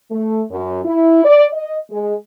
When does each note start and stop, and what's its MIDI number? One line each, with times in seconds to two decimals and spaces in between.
0.10 0.42 57
0.51 0.80 42
0.85 1.20 64
1.24 1.45 74
1.53 1.77 75
1.91 2.14 56